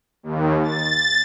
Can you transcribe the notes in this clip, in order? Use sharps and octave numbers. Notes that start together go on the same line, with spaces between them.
D#2
A6